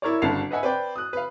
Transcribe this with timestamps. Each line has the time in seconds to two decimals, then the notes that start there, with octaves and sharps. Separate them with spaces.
0.02 E4 A#4 C#5 D5
0.22 G1 C#3 F#4 A5 C7 F7
0.51 B4 D#5 E5 F#5 G#5
0.63 B4 C5 D5 G5
0.96 D#6 F#6
1.13 B4 F5